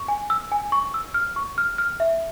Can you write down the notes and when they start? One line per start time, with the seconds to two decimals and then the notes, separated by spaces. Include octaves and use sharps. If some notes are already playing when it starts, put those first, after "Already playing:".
Already playing: C#6
0.08 G#5
0.30 E6
0.52 G#5
0.72 C#6
0.94 E6
1.14 F6
1.36 C#6
1.58 F6
1.78 F6
2.00 E5